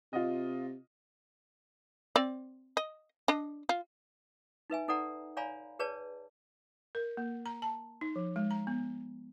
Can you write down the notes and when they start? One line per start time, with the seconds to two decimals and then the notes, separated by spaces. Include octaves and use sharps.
0.13 C3 F4 D#5
2.16 C4 D5
2.77 D#5
3.28 D4 D#5
3.69 F4
4.70 D#4 B4 E5 G#5
4.88 D#4 A4 B4 D5 F#5 A#5
5.37 C#5 D5 F5 G#5 A#5 B5
5.79 G#4 B4 C#5 D5 A5
6.95 A#4
7.17 A#3
7.46 A#5
7.62 A5
8.01 D#4
8.16 F3
8.36 G#3
8.51 A#5
8.67 B3